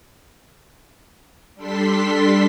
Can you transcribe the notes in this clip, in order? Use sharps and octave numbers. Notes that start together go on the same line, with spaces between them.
G3 D4 A4 C6 B6